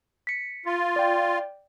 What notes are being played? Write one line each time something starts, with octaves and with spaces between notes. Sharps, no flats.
B6 C#7
F4
D5 G5